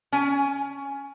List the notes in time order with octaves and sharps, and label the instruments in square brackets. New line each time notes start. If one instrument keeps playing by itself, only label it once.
[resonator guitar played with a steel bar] C#4 G#5